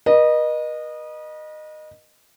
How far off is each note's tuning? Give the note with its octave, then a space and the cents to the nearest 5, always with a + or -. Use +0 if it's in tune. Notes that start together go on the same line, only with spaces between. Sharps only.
B4 -45 D#5 -20